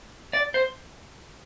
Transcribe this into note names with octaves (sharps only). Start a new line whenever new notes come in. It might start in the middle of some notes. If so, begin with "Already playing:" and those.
D5
C5